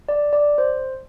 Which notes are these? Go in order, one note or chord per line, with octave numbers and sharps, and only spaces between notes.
D5
D5
C5